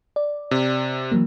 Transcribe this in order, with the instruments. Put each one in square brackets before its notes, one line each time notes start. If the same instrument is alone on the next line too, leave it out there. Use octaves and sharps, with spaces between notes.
[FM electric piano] D5
[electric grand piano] C3
[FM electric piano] E3 F#3 A#3